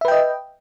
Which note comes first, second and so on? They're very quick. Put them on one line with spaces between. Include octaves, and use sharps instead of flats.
E5 B4 G5 D#5